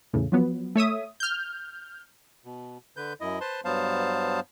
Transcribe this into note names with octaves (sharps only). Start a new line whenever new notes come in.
E2 A2 C#3
F3 F#3 B3
A3 C#5 E5 D#6
F6 G6
B2
D3 B4 G6
F#2 E4 D#5
B4 C5 A5 C6
G2 F#3 B3 C5 F5 A5